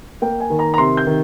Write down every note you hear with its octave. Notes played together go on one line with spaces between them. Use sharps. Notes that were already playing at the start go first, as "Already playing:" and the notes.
A#3 G5
G#5
D#3
A#5
A#5
C3 C6
G6
D#3